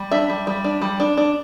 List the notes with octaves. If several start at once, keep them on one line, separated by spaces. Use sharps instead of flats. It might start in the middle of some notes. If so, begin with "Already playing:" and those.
Already playing: G3
D4 E5
G3
G3
D4
G3
D4
D4